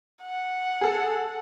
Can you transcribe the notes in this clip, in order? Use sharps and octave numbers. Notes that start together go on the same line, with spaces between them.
F#5
G#4 A4